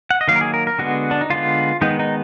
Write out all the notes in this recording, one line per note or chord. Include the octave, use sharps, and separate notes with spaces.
F#5
D#5
D#3 F#3 A#3 F5
A#4
G#4
A#4
A#4
D3 G#3 B3 F#4
D4
D#4
D3 G#3 B3 F4
D#3 G#3 B3 D#4
D#4